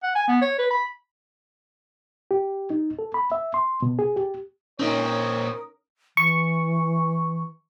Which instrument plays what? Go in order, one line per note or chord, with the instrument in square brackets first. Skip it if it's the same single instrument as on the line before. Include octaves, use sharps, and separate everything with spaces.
[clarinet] F#5
G#5
B3
C#5
B4
B5
[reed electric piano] G4
D#4
A4
B5
E5
C6
B2
G#4
G4
[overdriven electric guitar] A#2 C4 [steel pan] C#4 D#4 [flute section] A#4 D#6 [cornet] C#5
[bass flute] E3 [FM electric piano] C#6